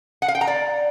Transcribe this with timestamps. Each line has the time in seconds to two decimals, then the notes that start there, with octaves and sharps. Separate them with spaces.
0.22 F#5
0.28 F5
0.35 G5
0.41 A#5
0.47 D5